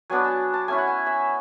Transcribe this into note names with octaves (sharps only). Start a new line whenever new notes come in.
F#3 B3 D4 G#5
A5
A5
A3 C#4 E4 G#5
F#5
G#5
E5